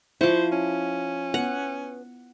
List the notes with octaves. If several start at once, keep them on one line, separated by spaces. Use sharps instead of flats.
F3 E4 C5 C#6
C#4
B3 F#5